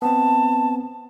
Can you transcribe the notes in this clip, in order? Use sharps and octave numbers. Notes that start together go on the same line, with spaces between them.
B3 C4 A5